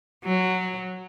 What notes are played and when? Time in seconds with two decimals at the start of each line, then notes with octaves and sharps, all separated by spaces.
0.24 F#3